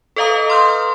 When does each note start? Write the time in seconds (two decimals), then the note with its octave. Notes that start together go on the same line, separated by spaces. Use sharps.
0.16 A4 B4 D#5 F5 A#5 D#6
0.50 C6 F6 G6